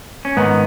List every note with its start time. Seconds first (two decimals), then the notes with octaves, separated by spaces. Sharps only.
0.25 C#4
0.37 G#2 D#3 B3